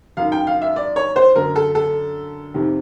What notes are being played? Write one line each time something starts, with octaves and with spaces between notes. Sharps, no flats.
F#2 D#3 F5
G5
F5
E5
D5
C#5
C5
F#2 D3 A#4
A4
A4
F2 C3 D#3